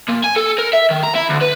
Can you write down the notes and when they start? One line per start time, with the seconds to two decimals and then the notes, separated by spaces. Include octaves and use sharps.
0.08 A#2
0.24 G#5
0.36 A4
0.58 A#4
0.73 E5
0.90 D#3
1.03 A#5
1.15 E4
1.29 D2
1.41 B4